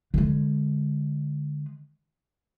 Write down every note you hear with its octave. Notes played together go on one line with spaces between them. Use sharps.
D3 G#3